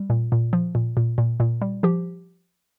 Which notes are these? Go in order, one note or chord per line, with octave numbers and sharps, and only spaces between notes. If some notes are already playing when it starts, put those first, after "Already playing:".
Already playing: G3
A#2
A#2
F3
A#2
A#2
A#2
A#2
G3
F3 G4